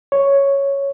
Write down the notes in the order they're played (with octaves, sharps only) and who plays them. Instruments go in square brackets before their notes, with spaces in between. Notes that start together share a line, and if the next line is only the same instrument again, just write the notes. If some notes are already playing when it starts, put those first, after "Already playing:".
[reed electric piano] C#5